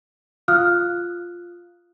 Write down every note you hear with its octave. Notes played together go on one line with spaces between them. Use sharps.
F4 F5 D#6 F6 F#6